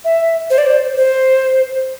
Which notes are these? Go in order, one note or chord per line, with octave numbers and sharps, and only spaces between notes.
E5
C5
D5
C5
C5